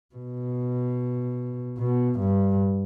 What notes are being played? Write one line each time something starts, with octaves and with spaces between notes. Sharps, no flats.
B2
B2
G2